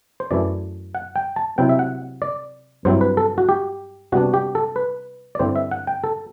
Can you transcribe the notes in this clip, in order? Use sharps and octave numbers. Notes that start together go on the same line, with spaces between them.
C5
F#2 E3 A3 E4 D5
F#5
G5
A5
C3 F#3 C4 E4 G5
E5
F#5
D5
G2 F#3 C4 E4 C5
B4
A4
F#4
G4
C3 G3 B3 D4 F#4
G4
A4
B4
D5
G2 D3 G3 C4 E4 C5
E5
F#5
G5
A4